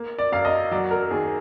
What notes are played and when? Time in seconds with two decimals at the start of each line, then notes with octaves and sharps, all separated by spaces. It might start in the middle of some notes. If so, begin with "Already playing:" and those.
Already playing: A#3
0.18 D5
0.32 F#2 F5
0.45 D#5
0.71 F#3 D5
0.91 A#4
1.11 D#2 G#4